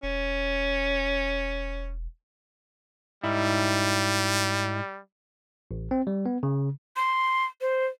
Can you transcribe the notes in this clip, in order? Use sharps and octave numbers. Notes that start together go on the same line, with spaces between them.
E1 C#4
G#2 G3 D#4 E4
A1
C4
G3
B3
C#3
C6
C5